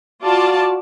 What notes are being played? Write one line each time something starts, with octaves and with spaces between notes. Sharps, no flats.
F4 F#4 D5 A5